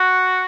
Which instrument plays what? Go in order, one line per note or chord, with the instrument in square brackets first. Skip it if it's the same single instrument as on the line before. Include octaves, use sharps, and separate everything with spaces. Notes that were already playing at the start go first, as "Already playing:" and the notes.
Already playing: [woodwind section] F#4